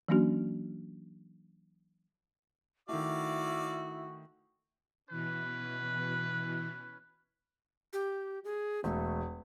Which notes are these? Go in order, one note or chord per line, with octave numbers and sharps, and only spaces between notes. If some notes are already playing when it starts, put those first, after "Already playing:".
E3 F#3 A#3 C#4 D4 F#4
D#3 A3 E4 F#4 D5 F5 D6
B2 E3 C#4 B4
G4
G#4
E1 A3